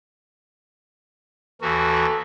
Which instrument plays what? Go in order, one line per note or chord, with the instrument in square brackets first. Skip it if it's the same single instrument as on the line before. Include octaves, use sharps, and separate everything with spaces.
[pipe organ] D#2 E3 F#4 [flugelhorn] A4